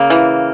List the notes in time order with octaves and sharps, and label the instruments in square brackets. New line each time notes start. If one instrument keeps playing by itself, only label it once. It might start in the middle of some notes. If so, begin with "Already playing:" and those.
Already playing: [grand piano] C#3 [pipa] A#3
[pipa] E3